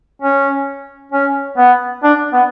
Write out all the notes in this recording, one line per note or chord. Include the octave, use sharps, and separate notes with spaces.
C#4
C#4
B3
D4
B3